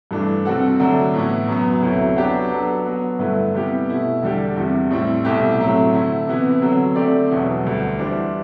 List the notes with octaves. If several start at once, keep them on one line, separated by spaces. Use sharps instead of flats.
G2 E3 A3 D4
C3 G3 C4 F#4 A4
D3 F#3 A3 D4
A2 E3 B3 E4
F#2 F#3 B3
D2 C3 F#3 A3 E4
F#3 B3 D4 G4 B4
F#3 B3 D4 A4
F#3 B3 F#4
G2 D3 A3 E4 B4
C3 G3 B3 E4 G4
B2 A3 E4
E2 D3 G3 D4 G4
E2 C3 E3 G3
A2 G3 C4 E4
C2 B2 A3 E4 G4
A2 F#3 A3 C4
D3 A3 E4
C3 E3 B3 E4
D3 F#3 C4
D3 A3 C4 G4 D5
E2 B2 F#3 B3 E4
D2 D3 G3
E3 G3 D4 G4 C5